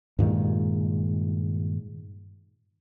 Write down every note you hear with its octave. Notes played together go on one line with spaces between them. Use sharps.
G2 A#2 D#3 G#3